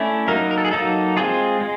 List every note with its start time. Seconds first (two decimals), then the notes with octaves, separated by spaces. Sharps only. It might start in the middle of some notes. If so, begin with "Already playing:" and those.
Already playing: A3 C#4 E4 D5
0.28 F#3 A#3 D#4 A#4
0.51 A#4
0.58 A4
0.65 G#4
0.71 F#3 A#3 D#4 A4
1.17 G#3 C4 F4 G#4
1.61 G#3